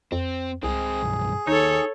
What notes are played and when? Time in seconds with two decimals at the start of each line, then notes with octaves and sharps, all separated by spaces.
0.12 F2 C4
0.63 C2 G#3 C4 G#4
1.02 B1 G2
1.47 D#2 D#4 A4 C#5